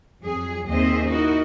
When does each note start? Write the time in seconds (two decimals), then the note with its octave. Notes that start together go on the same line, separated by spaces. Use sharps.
0.22 F2 F#3 G#4
0.67 D#2 C4 G#4 C5 D#5 E5
1.09 D#4 E4 F#4 A#4 D#5